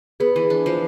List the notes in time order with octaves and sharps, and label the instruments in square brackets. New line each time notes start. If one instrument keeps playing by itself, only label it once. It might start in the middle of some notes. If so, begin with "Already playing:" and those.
[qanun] B3 [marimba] G#4 B4
[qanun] E3
D4
F3